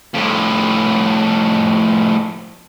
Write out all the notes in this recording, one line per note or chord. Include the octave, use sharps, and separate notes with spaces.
F2 A2